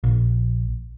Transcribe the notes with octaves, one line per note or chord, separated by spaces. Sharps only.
A#1